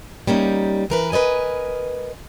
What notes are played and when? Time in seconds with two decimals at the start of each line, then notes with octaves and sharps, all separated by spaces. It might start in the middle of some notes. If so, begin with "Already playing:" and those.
0.27 G3 A#3 C#4 D#4
0.90 E3 A#4 B4
1.12 A#4 B4 D5 D#5 G#5